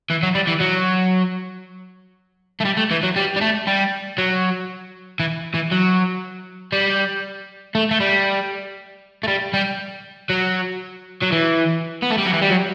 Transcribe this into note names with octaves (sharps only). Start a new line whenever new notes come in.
E3
F#3
G3
E3
F#3
A3
G3
A3
E3
F#3
G3
G3
A3
G3
F#3
E3
E3
F#3
G3
A3
A3
G3
A3
G3
G3
F#3
F#3
E3
B3
A3
G3
F#3
E3
G3
F#3